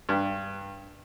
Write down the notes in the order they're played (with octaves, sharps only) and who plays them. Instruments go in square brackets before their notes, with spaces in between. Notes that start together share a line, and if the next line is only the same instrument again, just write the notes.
[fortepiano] G2